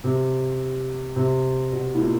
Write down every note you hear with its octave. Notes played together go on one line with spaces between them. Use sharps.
C3
C3
B2
A2
A#2